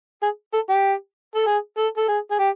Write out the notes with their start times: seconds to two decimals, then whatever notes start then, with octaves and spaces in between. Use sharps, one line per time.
0.23 G#4
0.54 A4
0.69 G4
1.36 A4
1.47 G#4
1.77 A4
1.97 A4
2.08 G#4
2.31 G#4
2.39 G4